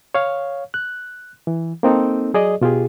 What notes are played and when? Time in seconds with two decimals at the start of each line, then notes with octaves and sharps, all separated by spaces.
0.15 C#5 F5
0.74 F#6
1.47 E3
1.83 A#3 C4 D#4 A4
2.34 F#3 G#4 D5 D#5
2.61 B2 F4 G4 G#4